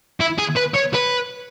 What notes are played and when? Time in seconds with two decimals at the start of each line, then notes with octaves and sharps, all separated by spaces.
0.20 E4
0.39 G#4
0.57 B4
0.76 C#5
0.95 B4